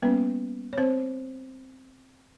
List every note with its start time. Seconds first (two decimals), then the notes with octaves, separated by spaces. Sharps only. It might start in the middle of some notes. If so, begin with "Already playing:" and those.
0.02 G3 A#3 B3 C#4 B4
0.73 C#5
0.78 C4 C5